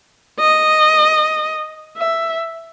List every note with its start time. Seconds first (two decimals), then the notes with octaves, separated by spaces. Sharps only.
0.39 D#5
1.96 E5